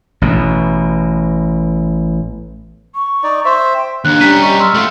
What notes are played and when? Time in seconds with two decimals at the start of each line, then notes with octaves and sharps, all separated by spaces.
0.22 A1 B2
2.95 C#6
3.23 D#4 D5
3.45 C5 E5
3.74 G5
4.05 D#2 D4 F#6
4.20 G3 C#4 A#5 B6 D#7
4.42 G4 D#5 C#6
4.60 C6 E6 F6
4.75 A3 F4